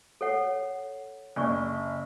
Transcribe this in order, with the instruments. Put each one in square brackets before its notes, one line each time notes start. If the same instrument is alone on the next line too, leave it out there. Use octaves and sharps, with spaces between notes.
[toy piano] A4 C#5 F#5
[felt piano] F#1 [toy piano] C#4 D5 C#6